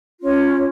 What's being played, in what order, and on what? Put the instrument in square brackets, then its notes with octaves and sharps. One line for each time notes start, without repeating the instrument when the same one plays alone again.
[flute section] C#4 F4 C#5